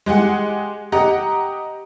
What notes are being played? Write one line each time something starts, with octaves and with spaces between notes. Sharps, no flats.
G#3 G4 G#4 F#5
G4 D#5 F#5 A#5